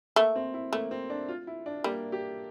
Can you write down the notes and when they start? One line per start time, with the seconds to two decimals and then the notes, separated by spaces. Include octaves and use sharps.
0.16 A3 A#3
0.36 C4
0.54 E4
0.72 A3 A#3
0.91 C4
1.10 D4
1.29 F4
1.47 E4
1.66 D4
1.84 G3 A#3
2.12 G4